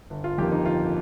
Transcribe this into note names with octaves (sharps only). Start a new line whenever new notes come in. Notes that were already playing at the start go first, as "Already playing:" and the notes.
G1
F4
F2 D#3 A#3 G4
D#4
G1 F4